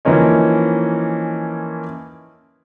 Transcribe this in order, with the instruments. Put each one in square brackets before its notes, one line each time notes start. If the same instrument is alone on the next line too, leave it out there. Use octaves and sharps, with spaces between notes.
[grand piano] E3 F3 A#3 C#4 D#4